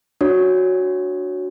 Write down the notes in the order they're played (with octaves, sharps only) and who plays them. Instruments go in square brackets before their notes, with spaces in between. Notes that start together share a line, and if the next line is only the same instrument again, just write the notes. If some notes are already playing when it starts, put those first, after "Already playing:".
[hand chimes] D4 F#4 C#5